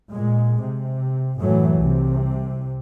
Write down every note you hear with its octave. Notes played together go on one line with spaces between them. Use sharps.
A#2 G#3
C3
F#2 A2 E3 F#3 A3
C2 C3